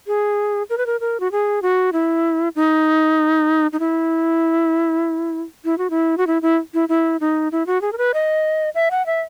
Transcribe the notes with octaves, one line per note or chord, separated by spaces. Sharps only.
G#4
A#4
B4
A#4
A#4
F#4
G#4
F#4
E4
D#4
D#4
E4
E4
F#4
E4
F#4
E4
E4
E4
E4
D#4
E4
F#4
G#4
A#4
B4
D#5
E5
F#5
E5